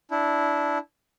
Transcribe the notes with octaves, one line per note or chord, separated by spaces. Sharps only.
D4 E4